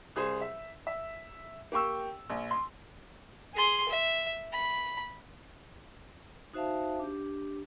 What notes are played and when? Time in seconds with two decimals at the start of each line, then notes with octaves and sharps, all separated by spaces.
0.16 C2 G#4 C5
0.41 E5
0.87 E5
1.72 A#3 G4 G5 C#6 E6
2.30 A#1
2.51 C6
3.55 G#4 C6
3.89 E5
4.53 B5
6.54 D#4 F#4 C5 E5 F5 A5
7.00 D4 G4